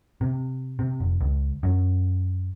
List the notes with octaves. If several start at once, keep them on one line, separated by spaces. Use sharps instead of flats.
C3
C3
F1
C#2
F#2